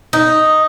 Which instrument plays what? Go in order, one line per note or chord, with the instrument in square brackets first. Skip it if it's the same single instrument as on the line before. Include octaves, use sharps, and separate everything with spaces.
[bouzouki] D#4